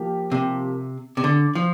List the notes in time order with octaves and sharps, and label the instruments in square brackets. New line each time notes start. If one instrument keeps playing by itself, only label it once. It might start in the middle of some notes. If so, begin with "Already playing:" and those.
Already playing: [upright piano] F3 A#3 G4
[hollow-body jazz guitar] C3
C3
D3
F3